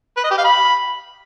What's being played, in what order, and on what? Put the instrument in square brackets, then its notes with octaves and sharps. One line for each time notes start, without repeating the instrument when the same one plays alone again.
[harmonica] B4
D#5
G4
F5
B5